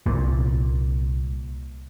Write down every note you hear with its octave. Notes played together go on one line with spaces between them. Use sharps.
C2 A#2